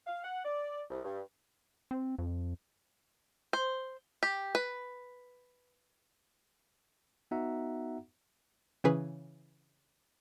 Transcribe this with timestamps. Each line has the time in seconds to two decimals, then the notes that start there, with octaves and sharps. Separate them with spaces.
0.07 F5
0.24 F#5
0.45 D5
0.90 C2
1.04 G2
1.91 C4
2.19 F2
3.53 C5
4.23 G4
4.55 B4
7.31 B3 D#4 F#4 E5 F#5 A#5
8.84 C#3 E3 C#4 G#4 B4